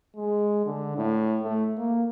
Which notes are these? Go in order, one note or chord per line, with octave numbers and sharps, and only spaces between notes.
G#3
D3
A2
A3
A#3